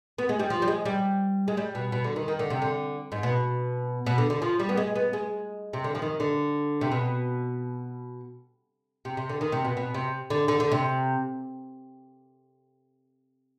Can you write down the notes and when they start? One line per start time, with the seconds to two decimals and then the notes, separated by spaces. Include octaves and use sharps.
0.18 B3
0.29 G#3
0.39 G3
0.50 F3
0.62 G3
0.68 G#3
0.85 G3
1.48 G#3
1.57 G3
1.75 B2
1.92 B2
2.04 D3
2.16 D#3
2.28 D#3
2.39 D3
2.50 C3
2.62 D3
3.12 G#2
3.23 B2
4.06 B2
4.18 D3
4.30 D3
4.42 F3
4.60 G3
4.69 B3
4.77 G#3
4.96 B3
5.13 G#3
5.73 C3
5.84 D3
5.95 F3
6.02 D#3
6.20 D3
6.81 C3
6.92 B2
9.05 C3
9.17 C3
9.29 D3
9.41 D#3
9.52 C3
9.65 B2
9.77 B2
9.94 C3
10.30 D3
10.48 D3
10.60 D3
10.72 C3